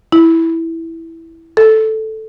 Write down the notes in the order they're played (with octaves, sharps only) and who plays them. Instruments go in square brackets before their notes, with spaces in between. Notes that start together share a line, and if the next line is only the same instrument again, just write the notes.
[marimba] E4
A4